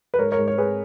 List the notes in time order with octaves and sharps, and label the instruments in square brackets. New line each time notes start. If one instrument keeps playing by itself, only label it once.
[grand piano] B4
G#2 A#4 C#5
A#4 C#5
G#2
C#5
G#2 G#4 B4